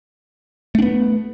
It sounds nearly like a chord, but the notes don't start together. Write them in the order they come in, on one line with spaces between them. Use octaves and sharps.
A3 D4 B3